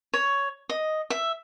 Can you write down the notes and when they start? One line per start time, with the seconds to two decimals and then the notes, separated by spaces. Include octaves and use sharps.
0.14 C#5
0.69 D#5
1.10 E5